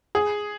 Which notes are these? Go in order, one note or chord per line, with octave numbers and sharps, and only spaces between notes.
G#4